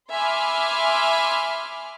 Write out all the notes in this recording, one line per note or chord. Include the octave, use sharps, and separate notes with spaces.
E5 G#5 B5 C6 D6 F6